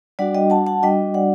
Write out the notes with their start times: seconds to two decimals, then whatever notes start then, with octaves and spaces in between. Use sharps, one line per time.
0.19 G3 D4 F#4 D5 F#5
0.35 D#5 G5
0.50 F#5 A5
0.66 F#5 A5
0.82 G3 D4 F#4 D#5 G5
1.14 D5 F#5